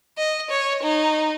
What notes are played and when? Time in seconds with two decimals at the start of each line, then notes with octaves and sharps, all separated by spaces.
0.18 D#5
0.50 C#5
0.83 D#4